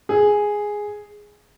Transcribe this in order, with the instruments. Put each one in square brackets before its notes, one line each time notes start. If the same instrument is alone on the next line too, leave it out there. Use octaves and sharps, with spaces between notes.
[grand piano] G#4